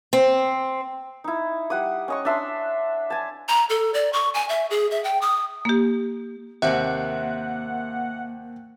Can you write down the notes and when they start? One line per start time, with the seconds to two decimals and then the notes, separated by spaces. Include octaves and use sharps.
0.13 C4
1.24 D#4 E4
1.70 G3 F#5 D#6
2.08 C#4 D#5 C#6
2.25 D4 E5 C6
3.10 G#5 A5
3.49 A#5
3.69 A4
3.94 D5
4.13 C#6
4.34 G#5
4.49 E5
4.70 G#4
4.91 E5
5.04 G5
5.22 D#6
5.65 A#3 G4
6.62 D#2 C3 A#3 C4 E5 F#5